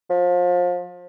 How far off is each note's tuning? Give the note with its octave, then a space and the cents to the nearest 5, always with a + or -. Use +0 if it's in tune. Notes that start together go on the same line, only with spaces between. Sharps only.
F3 +30